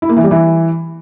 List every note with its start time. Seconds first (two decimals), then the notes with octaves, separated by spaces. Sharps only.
0.02 E4
0.09 A#3
0.17 E3
0.24 G3
0.31 E3